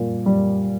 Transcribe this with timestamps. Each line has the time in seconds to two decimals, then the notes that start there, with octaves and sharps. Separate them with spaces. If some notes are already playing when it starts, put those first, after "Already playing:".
Already playing: A#2 G3
0.26 G3